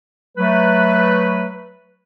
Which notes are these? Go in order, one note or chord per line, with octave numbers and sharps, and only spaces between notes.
F#3 A3 B4